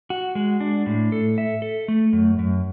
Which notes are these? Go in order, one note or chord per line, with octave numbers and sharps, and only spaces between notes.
F#4
G#3
D4
A2
A4
E5
A4
A3
F#2
F#2